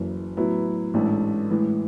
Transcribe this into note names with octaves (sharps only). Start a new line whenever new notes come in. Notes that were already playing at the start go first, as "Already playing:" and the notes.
Already playing: F#1 F#2 E3
A2 F#3 B3 E4
A1 G#2 E3 A3 D4
A2 E3 G#3